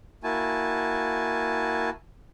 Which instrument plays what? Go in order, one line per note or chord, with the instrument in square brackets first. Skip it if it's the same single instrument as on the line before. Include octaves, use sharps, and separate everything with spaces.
[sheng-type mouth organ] A#3 E4 F#4 G#5 A5